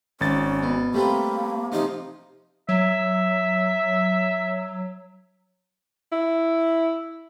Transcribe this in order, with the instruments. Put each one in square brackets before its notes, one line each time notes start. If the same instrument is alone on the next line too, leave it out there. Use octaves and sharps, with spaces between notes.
[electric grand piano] G#1 A6 [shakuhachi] C#4
[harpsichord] B2
[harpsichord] G3 C4 B4 [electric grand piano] A3 [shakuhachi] A#3
[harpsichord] C3 F3 [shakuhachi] D#4
[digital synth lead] F#3 [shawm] E5
[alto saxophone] E4